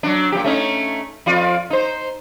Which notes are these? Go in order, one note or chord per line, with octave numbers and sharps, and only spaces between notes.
F#3 D4
A#2 F#3 G4
A3 C#4 D#4
F2 F4 D5
D#4 C5